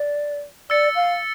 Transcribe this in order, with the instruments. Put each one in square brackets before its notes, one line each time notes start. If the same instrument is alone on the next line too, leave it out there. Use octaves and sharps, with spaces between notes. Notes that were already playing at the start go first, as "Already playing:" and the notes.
Already playing: [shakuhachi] D5
[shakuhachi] D5 [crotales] E6 A6 C#7
[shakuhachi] F5